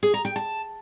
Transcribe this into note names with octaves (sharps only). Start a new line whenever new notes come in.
G#4
A#5
G5
A5